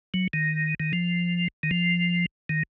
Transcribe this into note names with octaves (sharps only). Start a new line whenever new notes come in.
F#3
D#3
D#3
F3
D#3
F3
D#3